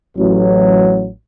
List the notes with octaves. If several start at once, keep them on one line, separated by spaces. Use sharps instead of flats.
A1 F#3